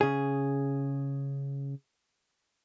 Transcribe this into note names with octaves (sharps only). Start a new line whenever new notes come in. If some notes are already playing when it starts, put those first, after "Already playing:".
C#3 G#4